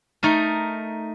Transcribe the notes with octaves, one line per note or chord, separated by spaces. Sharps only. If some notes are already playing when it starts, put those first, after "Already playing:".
A3 D#4 A#4